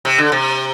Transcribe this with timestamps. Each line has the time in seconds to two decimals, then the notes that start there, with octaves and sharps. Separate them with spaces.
0.05 C3
0.18 D3
0.32 C3